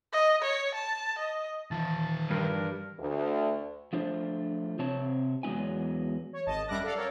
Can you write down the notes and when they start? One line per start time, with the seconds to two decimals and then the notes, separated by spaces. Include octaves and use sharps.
0.13 D#5
0.42 C#5
0.74 A5
1.18 D#5
1.71 D#3 E3 F4 A5
2.30 G2 A#4
2.99 D2
3.93 F3 A3 D4 F4 C5
4.79 C3 C4 C#5 A5
5.43 E2 F#3 G#3 B3 E4 G#5
6.33 C#5
6.46 G#1 D#5 A5
6.68 F#2 G3 E5 D6 F#6 A#6
6.83 A4 D5 F5 F#5
6.96 A4 A#4 C#5